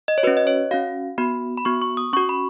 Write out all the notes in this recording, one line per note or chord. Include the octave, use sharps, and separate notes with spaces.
D#5
C#5
C#4 F#4 B4
D#5
C#5
C#4 F#4 F5
B3 F#4 B5
B5
B3 F#4 C#6
C#6
D#6
C#4 F#4 C#6
B5